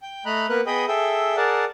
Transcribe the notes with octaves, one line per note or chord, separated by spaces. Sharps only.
G5
A3 D#5 A#5 B5 F#6
A#3 B3 A#4 B4 F#6
B3 G#4 D#5 G5 B5 D#6
G#4 A4 E5 G5
G#4 A#4 D5 F#5 A5